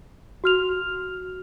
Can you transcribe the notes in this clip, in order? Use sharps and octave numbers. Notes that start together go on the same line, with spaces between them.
F#4 F6 F7